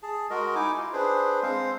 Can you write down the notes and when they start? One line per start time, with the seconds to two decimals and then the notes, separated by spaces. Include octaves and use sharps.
0.03 G#4 A5
0.30 G#3 F#4 A#4 D#5
0.55 D#4 E4 G#5 D6
0.77 F4
0.93 D4 G#4 B4 C5
1.43 G#3 C4 C5 F5